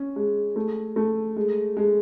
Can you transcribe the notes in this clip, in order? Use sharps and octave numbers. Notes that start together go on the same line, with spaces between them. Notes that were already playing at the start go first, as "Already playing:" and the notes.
Already playing: C#4
G#3
A3
A3
G#3
G#3